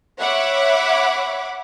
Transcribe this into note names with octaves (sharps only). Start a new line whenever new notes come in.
C#5 E5 F#5 B5 D6